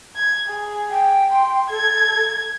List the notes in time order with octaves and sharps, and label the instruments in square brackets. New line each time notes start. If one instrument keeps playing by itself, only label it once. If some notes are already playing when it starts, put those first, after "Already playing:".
[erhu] G#6
G#4
[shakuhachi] G5
[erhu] C6
[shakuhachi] A4 [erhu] G#6